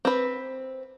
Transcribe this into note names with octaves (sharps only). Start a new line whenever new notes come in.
C4 B4